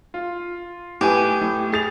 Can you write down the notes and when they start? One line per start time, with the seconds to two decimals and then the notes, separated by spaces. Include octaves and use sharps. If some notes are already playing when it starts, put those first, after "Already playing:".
0.14 F4
1.01 A2 G4 B4 G#5
1.41 A2
1.72 G#4 A6 F7